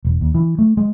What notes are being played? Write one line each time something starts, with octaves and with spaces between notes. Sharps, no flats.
E1
D#2
E3
A3
G#3